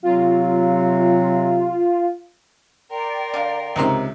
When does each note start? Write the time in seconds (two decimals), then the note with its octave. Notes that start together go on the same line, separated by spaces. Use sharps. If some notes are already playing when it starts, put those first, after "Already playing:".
0.03 C3 F#3 C4 F4
2.91 A#4 D5 G5 C6
3.34 D3 F5
3.76 C#2 C3 D#3 A#4 C5